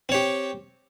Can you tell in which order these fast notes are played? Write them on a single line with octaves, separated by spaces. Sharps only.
C4 C#5 G4